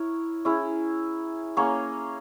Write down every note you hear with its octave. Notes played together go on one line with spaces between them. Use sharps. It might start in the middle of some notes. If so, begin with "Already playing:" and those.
Already playing: E4 A#4 C#5
C#4 E4 G#4
A#3 C#4 G#4 C#5